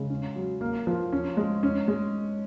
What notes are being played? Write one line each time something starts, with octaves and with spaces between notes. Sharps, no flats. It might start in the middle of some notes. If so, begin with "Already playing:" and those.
Already playing: C#3 G#3
C#4
F#3
A#3
F3
C#4
G#3
C#4
G#3